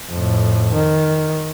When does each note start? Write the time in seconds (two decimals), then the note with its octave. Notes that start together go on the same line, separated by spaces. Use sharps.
0.11 F2 A2
0.74 D#3